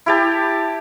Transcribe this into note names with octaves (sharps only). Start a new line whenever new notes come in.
E4 G4 A5